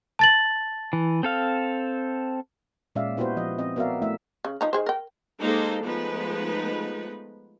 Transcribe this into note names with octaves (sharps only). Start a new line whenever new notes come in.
A5 A6 F#7
E3
C4 A4 F5
A#2 G#3 C#4 D5 E5 F5
B3 E4 F#4 G4 B4 C5
F3 D#5
C4 D#5
B3 F#4 A#4 D5 E5 F5
A3 E4 E5
C#3
F3 D#4 A#5
D#3 G#4 C5
A#4 G5
G#3 A#3 D#4 G4 A4 C5
F3 G#3 A3 B3 D#4 B4